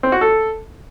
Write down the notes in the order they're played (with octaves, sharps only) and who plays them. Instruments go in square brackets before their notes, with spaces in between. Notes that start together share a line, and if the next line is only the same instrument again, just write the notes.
[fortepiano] C4
F#4
A4